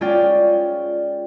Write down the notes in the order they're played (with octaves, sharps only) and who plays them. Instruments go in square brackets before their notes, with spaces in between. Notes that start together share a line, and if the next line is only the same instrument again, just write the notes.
[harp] G#3 C#4 F4 D5 G5